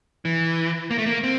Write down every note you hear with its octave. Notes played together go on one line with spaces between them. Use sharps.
E3
A#3
A3
A#3
C4